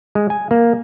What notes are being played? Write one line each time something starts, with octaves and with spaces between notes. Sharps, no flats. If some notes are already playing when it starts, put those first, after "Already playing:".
G#3
G#5
A#3